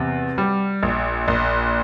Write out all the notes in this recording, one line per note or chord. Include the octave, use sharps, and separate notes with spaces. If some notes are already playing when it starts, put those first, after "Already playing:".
Already playing: E2 C3
G3
A#1
A#1